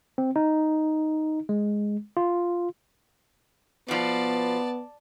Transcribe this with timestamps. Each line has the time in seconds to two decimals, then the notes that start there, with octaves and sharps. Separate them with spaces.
0.18 C4
0.36 D#4
1.49 G#3
2.17 F4
3.88 B2 F3 B3 D5 A5